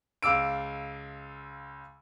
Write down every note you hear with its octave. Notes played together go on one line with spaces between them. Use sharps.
C#2 F5 D6 E6 D7